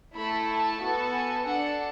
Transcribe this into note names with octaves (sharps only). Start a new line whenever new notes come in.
A3 E4 A4 B5
A5
B3 F#4 A4
G#5
D4 A4 F#5